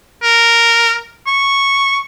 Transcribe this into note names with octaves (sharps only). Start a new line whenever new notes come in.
A#4
C#6